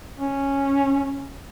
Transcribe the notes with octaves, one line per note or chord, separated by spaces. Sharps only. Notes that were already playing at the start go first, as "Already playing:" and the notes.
C#4